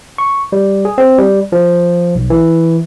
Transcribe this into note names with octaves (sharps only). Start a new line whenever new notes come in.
C#6
G3
G#4
C4
G3
F3
B1
E3